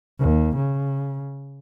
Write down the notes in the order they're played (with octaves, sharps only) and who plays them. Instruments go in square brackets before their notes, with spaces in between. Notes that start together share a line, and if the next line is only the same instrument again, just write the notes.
[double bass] D#2
C#3